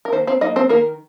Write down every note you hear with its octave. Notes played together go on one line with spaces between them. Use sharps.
A#4
D#3 A#3 C5
C4 C5
F#3 A#3 D#4 D#5
C4 C5
D#3 A#3 A#4